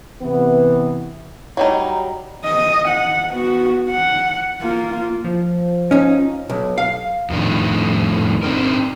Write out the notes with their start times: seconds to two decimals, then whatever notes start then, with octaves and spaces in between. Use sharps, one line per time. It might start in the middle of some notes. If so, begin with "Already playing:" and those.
0.22 C3 E3 B3
1.57 F#3 G3 D#4
2.44 D#5
2.88 F#5
3.31 B3 F#4
3.91 F#5
4.61 A#3 F4
5.24 F3
5.91 C#4 D#4
6.49 B1
6.78 F5
7.30 F2 A2 D#3 D4
8.43 C4 D4 D#4 A#4